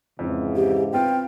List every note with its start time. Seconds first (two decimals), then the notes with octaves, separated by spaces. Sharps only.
0.19 F2 G#2 C#3 E3
0.56 G4
0.93 B3 C4 F4 G5